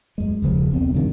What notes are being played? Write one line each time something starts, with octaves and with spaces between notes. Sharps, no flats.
F#2 G#3
E1 C#3 F3
D#1 B1 B3 C4
G2 C3 D#3